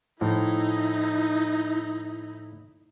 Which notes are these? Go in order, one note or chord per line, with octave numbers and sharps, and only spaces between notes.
A2 F3 D#4 E4